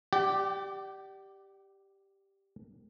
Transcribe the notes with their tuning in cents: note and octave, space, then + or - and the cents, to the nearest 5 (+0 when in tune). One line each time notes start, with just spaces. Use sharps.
G4 +0 D5 +15 G5 -45